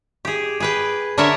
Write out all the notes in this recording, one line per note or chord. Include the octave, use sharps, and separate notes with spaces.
G4 G#4
G#4 B4 G5
D3 A#4 C#5 D5 E5